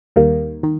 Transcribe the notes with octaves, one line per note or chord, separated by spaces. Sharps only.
D#2 D#3 G3 A#3
D#3